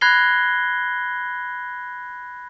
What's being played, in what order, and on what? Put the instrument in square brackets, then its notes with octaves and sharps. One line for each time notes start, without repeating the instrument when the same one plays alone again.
[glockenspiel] B5 F#6 G#6 A#6 C7 G7